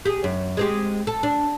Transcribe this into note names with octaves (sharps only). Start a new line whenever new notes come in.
G4 G#4
F#2
G#3 C4 G4
A4
D4